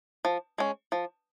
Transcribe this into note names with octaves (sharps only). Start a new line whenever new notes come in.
F3
G#3 C#4
F3